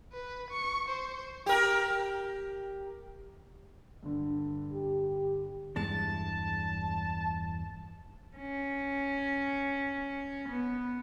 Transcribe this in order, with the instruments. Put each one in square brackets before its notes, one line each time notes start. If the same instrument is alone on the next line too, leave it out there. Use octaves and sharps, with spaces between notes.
[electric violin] B4
C#6
C5
[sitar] G4 A#4
[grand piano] G2 D3
[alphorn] G4
[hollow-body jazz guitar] E2 G2 G#3 [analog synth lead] A5
[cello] C#4
B3